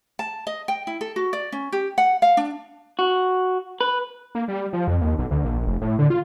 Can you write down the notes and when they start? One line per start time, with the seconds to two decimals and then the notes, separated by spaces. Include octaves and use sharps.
0.19 A5
0.47 D#5
0.68 G5
0.87 E4
1.01 A4
1.16 F#4
1.33 D5
1.52 C#4
1.73 G4
1.98 F#5
2.22 F5
2.37 D4
2.99 F#4
3.81 B4
4.35 A#3
4.48 G3
4.73 F3
4.87 F2
5.01 D#2
5.19 B1
5.31 D2
5.45 A#1
5.67 F1
5.81 A2
5.99 D3
6.10 F4